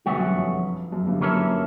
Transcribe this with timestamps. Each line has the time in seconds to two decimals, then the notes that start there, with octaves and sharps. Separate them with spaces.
0.06 G1 G2 B2 F#3 A3 C#4 F#4
0.15 F#2
0.25 F#2
0.35 F2
0.92 F#2
1.06 G1 G2
1.21 F#3 A#3 C#4 E4 A4